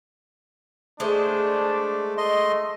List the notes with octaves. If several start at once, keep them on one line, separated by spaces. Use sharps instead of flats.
G#3 A3 D4 C5
A3 D#5 C6